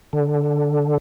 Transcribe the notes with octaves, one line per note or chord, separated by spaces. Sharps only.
D3